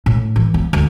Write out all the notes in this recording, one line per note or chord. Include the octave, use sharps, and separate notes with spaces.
A2
E3
B3
D2